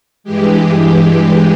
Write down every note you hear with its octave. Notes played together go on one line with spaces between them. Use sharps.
G2 E3 G#3 G4
G4
G4